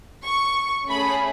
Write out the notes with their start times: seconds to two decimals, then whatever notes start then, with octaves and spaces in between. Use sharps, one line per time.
0.23 C#6
0.89 A3 C#4 G#4 B5